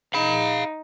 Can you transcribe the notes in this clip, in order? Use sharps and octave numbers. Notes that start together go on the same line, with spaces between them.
D#4 F5 B5